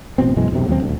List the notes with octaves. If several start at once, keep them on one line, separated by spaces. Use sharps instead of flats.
A1 B2 C4
F#2 B2 E3 G#3
E1 B1 F#2 C3
D#2 F#3 G#3 C4
D#1 D2